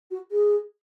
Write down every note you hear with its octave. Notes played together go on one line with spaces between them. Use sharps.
F#4
G#4